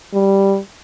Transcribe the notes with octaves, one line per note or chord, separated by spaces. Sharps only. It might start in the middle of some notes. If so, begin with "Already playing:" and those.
G3